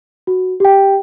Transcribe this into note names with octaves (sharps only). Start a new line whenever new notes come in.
F#4
G4 G5